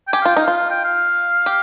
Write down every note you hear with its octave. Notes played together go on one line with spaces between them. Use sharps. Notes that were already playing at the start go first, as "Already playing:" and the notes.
G5
G4 G#5
F5
F4 G5
D#4
F4 F5
F5
G5
F5
G4